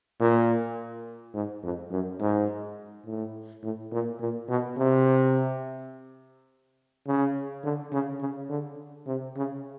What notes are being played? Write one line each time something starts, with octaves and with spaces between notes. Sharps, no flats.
A#2
G#2
F2
F#2
G#2
A2
A2
A#2
A#2
B2
C3
C#3
D3
C#3
C#3
D3
C3
C#3